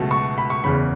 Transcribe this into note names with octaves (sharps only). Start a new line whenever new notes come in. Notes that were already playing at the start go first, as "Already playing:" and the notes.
Already playing: C#2 B2 F#3 A3
C#6
B5
C#6
F#1 E2 C#3 B5